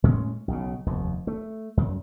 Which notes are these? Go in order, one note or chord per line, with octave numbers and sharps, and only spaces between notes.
A2 G#3 C#4
B1 C#3
F1 D#2
A3
F#2